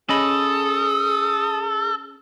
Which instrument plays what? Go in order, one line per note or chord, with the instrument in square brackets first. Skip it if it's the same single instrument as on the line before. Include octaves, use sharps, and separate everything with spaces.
[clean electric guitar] C#4 D#5 B5 [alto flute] G#4 [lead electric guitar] A4 [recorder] D#6